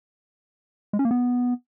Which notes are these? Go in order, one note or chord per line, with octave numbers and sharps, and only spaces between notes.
G#3
C#4
A#3
B3